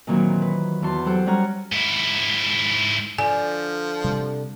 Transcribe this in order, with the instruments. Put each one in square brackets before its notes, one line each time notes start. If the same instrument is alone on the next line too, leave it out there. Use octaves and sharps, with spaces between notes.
[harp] A#2 D#3 E3 F#3 A#3 C4
B4
E2 F#4 A5 C6
F#3 G4 A4 C5 F#5
G3 C#4 C#5 F#5 A#5 F6
[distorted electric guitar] G#2 E4
[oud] D3 D4 [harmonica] F3 [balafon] G#5
[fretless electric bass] C3 G3